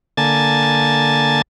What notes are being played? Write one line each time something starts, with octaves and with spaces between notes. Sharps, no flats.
D3 A#3 G#5 A5 A6